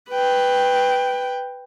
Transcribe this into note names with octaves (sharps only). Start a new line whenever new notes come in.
B4 G5